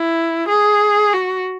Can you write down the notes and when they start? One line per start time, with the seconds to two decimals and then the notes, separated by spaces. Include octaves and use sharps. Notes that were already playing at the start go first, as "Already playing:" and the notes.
Already playing: E4
0.49 G#4
1.13 F#4